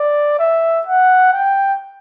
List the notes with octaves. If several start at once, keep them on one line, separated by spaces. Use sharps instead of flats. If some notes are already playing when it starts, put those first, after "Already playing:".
Already playing: D5
E5
F#5
G5